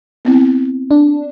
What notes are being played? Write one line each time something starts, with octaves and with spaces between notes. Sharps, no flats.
B3 C4 E4
D4